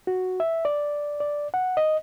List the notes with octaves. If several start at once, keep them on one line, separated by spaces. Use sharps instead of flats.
F#4
E5
D5
D5
F#5
D#5